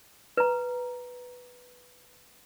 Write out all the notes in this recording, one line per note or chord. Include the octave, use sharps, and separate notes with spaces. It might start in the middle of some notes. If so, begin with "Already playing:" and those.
B4 A#5